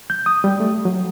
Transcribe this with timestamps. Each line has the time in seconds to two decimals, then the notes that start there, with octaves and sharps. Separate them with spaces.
0.10 G6
0.26 D#6
0.44 G3
0.60 A3
0.85 F#3